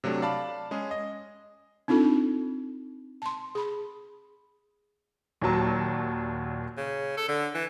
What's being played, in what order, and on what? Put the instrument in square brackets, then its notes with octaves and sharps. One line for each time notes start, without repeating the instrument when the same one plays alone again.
[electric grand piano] C3 F#3 A3 D4
D5 F5 A5 B5
G#3 C#4 G#4
D#5
[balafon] C4 D4 D#4 F4 A4
A5 C6
G#4 B5
[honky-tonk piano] D#2 A#2 F#3 A5 A#5
[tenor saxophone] C#3
A4
D3
E3